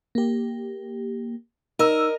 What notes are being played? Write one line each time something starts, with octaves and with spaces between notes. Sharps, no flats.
A#3 G4
D#4 A#4 D#5 E6